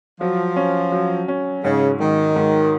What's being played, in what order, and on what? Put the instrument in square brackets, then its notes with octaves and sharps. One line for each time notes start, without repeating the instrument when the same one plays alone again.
[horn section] F3 [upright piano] F#3
[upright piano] C#4
F#3
C#4
[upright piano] G#2 [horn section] C#3
[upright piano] G#2 [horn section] D#3
[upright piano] G#2